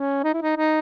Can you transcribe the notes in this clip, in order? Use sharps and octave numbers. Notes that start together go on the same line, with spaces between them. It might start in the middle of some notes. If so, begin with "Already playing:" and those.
Already playing: C#4
D#4
E4
D#4
D#4